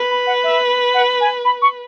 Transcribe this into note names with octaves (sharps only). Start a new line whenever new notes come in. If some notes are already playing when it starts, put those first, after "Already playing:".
Already playing: B4
B5
F#5
E5
F#5
G#5
B5
C#6